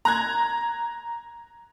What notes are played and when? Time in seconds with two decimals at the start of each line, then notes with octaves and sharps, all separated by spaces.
0.05 A#5 F#6 G#6